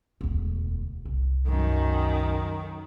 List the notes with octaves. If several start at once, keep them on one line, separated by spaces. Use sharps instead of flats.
E1 D2
C2
F#2 D#3